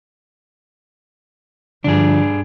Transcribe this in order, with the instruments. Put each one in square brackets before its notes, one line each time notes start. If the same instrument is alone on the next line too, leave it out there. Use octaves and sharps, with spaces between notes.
[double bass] G2 [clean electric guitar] D3 F3 [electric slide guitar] D4 G#4